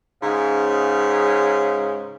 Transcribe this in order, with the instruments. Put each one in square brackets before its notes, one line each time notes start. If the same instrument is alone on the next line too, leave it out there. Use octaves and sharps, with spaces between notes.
[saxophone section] G#2 C#3